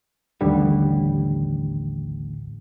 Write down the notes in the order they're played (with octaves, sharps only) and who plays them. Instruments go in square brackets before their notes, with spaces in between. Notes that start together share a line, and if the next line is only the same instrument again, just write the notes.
[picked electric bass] A1 D#2 D3 G3